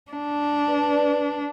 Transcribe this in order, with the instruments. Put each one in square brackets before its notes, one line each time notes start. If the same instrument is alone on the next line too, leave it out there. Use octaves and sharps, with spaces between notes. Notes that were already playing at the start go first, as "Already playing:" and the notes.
[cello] D4
[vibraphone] B4 D5 A5